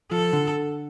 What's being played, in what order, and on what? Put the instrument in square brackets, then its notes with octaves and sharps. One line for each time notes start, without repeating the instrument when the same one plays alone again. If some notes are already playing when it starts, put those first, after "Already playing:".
[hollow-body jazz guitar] F3 [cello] A4
[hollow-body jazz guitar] D3